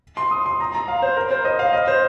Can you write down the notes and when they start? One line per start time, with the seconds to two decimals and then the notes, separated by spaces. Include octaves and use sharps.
0.17 C6
0.31 D#6
0.46 C6
0.60 A#5
0.74 A#5
0.88 F5
1.02 C5
1.17 A#4
1.31 C5
1.45 D#5
1.59 F5
1.73 D#5
1.88 C5